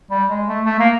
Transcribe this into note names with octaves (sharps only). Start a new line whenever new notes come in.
G3
G#3
A3
A3
A#3